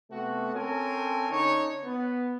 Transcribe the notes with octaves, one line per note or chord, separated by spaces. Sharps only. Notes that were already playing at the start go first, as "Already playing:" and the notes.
C3 A3 B3 F#4
C4 C#4 A4 A#4 G#5
D3 C#4 D#4 C#5
B3